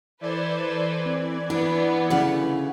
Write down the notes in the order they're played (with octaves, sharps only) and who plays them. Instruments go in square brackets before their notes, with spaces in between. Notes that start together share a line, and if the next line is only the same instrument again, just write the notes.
[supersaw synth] E3 D5 G#6 [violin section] A4 B4 C5
[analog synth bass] C4
[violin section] B3 [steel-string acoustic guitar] D4 [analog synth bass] E4
[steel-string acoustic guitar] D2 C#3 F#5 [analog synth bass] E4